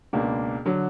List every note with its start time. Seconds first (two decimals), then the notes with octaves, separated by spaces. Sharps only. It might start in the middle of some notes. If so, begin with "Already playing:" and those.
0.13 C#2 B2 A#3 D4
0.66 D3 F#3